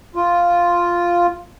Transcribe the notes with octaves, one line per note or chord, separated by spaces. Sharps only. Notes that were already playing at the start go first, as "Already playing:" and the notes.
F4